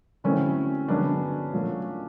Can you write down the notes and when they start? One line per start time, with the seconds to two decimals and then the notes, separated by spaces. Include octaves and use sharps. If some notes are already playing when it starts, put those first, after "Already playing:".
0.24 D3 F#3 A3 C4 C#4 E4
0.88 G2 D3 F#3 B3 D4
1.53 A#2 F#3 A3